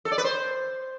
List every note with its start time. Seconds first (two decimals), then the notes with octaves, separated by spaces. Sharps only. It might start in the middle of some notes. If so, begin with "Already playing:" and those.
0.05 A4
0.12 D5
0.18 B4
0.24 C5